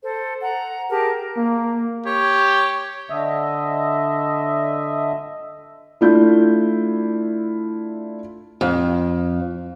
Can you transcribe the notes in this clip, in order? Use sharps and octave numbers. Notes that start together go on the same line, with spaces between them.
A4 C5
F#5 A#5
G4 G#4 A#4 A5
A#3
G4 C#5
D3 D#5 E5
A3 D4 E4 F4 G6
F2